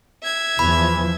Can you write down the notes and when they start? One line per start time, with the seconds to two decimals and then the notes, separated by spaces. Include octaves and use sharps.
0.24 E5 G#6
0.59 E2 E3 F3 B5